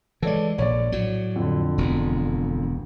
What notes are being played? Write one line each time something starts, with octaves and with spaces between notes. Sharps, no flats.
E3 G#3 A4 C#5 D5
A#1 C#5 D5
A2 F#3
F2 D3
E1 D2